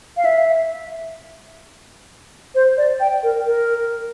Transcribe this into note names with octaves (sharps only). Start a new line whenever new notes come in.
F5
E5
C5
D5
G5
A#4
A#4